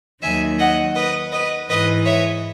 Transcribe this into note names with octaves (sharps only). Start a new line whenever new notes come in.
D#2 D#3 F#3 E5 G#5
D#5 F#5
B4 D#5
B4 D#5
G#2 E3 B4 D#5
C#5 E5